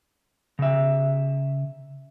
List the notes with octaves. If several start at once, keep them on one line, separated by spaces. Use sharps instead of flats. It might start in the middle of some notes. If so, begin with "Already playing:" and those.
C#3 E5